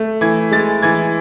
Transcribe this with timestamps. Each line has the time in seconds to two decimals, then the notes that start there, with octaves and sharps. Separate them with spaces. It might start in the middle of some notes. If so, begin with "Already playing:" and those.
Already playing: A3
0.21 E3 G#6
0.51 G#3 A6
0.82 E3 G#6